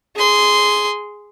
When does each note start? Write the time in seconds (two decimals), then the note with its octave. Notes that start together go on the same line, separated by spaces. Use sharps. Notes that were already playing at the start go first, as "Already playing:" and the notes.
0.16 G#4 C6